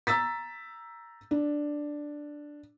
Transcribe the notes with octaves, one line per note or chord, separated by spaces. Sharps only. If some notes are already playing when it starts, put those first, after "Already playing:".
A#5 E6 A6 B6
D4